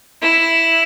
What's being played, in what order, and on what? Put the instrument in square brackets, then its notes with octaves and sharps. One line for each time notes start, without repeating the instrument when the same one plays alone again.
[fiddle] E4